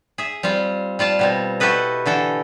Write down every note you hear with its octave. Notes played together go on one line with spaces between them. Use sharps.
G#4 E5
G3 C4 F4
G3 F4 D5 A5
B2 G3 C4
E4 F#4 G4 A4 B4 D#5
D3 E3 A4 G5